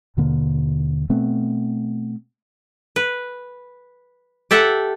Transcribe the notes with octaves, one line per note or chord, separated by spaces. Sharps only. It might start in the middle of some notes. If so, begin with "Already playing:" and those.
D#2 B2 D3 A#3
B2 A3 B3 C4
B4
G4 A4 E5 F#5